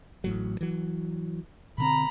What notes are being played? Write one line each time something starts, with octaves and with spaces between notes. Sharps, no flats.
A1 A2 F#3
E3 F#3
B2 D3 C4 A#5 B5